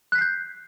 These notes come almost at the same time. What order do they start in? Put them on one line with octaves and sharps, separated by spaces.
F#6 B6 C7 G6